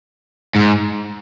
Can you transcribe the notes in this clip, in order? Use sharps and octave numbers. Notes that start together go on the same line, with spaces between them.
G#2